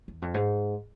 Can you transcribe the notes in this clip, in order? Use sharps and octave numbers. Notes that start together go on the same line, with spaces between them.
E2
F2
G#2